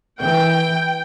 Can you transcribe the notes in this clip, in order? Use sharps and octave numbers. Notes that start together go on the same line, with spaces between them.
E3 G5